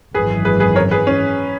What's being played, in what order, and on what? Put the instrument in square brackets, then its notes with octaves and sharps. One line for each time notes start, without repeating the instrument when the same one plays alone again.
[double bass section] G#1 F#2 E3 G#3 [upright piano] G#4 B4
[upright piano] G#4 B4
G#4 B4
A#4 C#5
G#4 B4
C#4